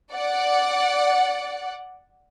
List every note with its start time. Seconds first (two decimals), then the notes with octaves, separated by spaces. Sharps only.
0.13 D5 F#5